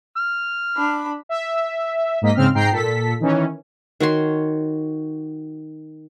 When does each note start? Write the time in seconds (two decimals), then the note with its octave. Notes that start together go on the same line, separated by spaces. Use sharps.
0.17 F6
0.77 D4 B5
1.29 E5
2.21 G#2 A#3 D#5 B6
2.35 G#2 C#3 C4 F6
2.54 G#2 G5 A#5 C7
2.71 A#2 A4 B6
3.20 D#3 E3 C#4
4.00 D#3 F#4 C#5 C6